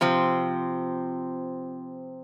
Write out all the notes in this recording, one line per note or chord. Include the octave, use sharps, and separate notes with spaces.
C3 F3 C4